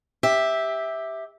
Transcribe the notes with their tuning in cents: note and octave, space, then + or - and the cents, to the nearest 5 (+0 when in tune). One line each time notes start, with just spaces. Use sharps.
G4 +10 E5 -10